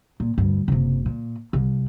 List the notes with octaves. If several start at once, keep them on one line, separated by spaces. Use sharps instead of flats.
A#2
D2 G2
F#1 C3
A#2
C2